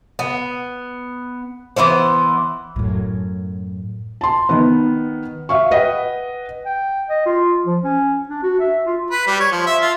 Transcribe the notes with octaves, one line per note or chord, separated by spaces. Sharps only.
B3
E3 B3 E4 C5
F#2 A2
A5 C6
D#3 B3
E5 F5 C#6
B4 D#5 F#5 G5
G5
D#5
F4
F3
C#4
D4
F#4
E5
F4
B4
G3
C#5
F3
E5
F4